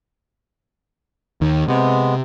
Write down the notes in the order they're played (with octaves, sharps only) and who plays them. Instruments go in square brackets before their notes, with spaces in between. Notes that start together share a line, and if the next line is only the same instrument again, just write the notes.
[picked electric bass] D#2 D#3
[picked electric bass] C3 [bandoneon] G#3 B3